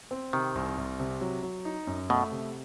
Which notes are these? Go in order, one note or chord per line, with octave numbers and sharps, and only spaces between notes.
C4
C3 D#3
C2
C2
C3
F#3
F#3
D#4
F#2
B2 A3
C3